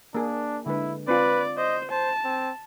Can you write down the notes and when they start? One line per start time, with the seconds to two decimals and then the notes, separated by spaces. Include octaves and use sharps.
0.15 A#3 D4 G#4
0.66 D3 G#3 E4 B4
1.08 C4 F4 B4 D5
1.57 C5 D#5
1.91 C5 A5
2.25 C4